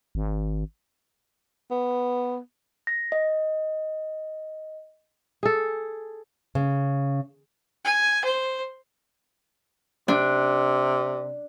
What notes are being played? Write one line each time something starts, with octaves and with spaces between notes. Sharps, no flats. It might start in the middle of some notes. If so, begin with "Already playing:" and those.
G#1
B3
A#6
D#5
G#4 A4
C#3
G#5
C5
C3 D4